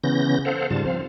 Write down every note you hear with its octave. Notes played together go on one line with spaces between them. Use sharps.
C#3 E3 B3 C#4 G6 A#6
A4 C5 F5 F#5
G#2 C#3 G3 F4 A5
F3 C4 F5